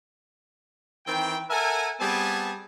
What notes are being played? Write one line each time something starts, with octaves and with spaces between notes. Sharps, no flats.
D#3 E3 C4 G5
A4 A#4 E5 F#5 G#5
G3 B3 C4 G#4 G#5 A5